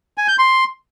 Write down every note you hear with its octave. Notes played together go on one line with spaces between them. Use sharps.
G#5
G6
C6